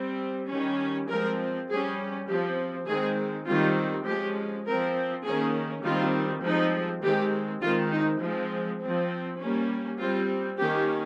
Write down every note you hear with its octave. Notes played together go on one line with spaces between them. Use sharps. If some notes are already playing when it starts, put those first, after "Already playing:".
Already playing: G3 C4
D#3 G3 C#4
F3 G#3 C4 A#4
G3 C#4 G#4
F3 C4 G4
D#3 G#3 C4 G#4
D#3 G3 C4 F4
F3 G#3 C#4 G4
F3 C4 A#4
D#3 A#3 C#4 G#4
D#3 G3 C4 F4
F3 G#3 C4 D#4
D#3 G#3 C4 G4
D#3 G#3 C4 F4
D#4
F3 G#3 C4
C4
F3
G3 A#3 C#4
G3 C4 F4
D#3 A#3 C#4 G4